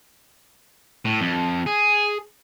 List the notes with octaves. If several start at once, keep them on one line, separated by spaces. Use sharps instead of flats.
A2
F2
G#4